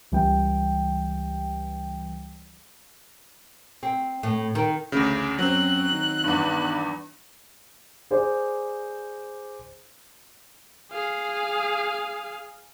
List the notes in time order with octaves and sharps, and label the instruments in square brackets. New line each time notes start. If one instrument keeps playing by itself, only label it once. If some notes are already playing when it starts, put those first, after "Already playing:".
[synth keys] C#2 E3 G3 G5
[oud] C4
A2
D#3
[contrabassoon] A1 [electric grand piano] D2 C#3
[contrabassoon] F#2 [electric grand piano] F#3 C4 [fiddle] F#6
[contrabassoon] D#3
[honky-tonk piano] E2 G2
[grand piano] G#4 C5 D5
[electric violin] G#4 F5